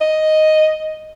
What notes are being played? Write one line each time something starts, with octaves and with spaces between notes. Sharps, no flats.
D#5